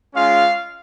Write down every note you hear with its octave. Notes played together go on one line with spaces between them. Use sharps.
G#3 C#4 F4 F5